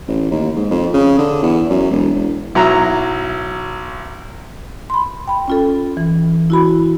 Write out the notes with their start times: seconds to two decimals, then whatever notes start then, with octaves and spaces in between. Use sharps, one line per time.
0.08 A1
0.31 D#2
0.56 G#2
0.71 F2
0.94 C#3
1.18 D3
1.43 E2
1.70 F#2
1.90 E1
2.15 E1
2.55 B1 F#3 E4 A#5
4.90 B5 C6
5.28 G5 B5
5.48 C#4 F4 A4
5.97 E3
6.50 E4 F#4 B5